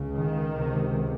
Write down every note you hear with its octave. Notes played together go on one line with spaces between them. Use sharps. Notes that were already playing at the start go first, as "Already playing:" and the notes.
Already playing: C#2 C#3
D#3
C#2 C3